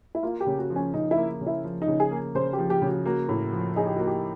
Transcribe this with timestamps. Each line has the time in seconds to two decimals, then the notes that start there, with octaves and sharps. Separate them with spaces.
0.15 E4
0.23 A#3 F4
0.40 G4
0.47 C#3
0.59 F#4
0.70 F3
0.76 C#4
0.94 C#3 D#4
1.11 E4
1.17 A#3
1.41 C#3
1.47 E4
1.64 F3
1.82 D#4
1.88 C#3
2.00 G#4
2.11 A#3
2.35 C#3 C5
2.53 G4
2.59 F3
2.70 G4
2.82 C#3
2.88 F#4
3.06 A#3 F#4
3.29 A2
3.53 F3
3.76 D#4 G#4
3.86 G4
3.96 A#3 F#4
4.07 G4